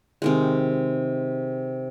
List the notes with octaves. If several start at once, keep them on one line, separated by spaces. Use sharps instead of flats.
C3 D#3 G#3